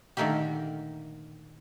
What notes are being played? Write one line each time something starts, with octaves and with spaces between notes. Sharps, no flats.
A#2 D3 D#3 A3 A#3 G4